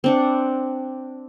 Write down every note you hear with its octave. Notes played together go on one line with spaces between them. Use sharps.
C4 D4 F#5